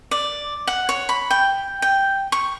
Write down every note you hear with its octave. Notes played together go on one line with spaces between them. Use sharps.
D5
F#5
C#5
B5
G5
G5
C#6